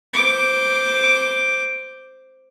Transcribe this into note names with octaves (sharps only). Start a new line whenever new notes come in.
C5 D6